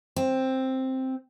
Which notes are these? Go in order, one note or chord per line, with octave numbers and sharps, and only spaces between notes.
C4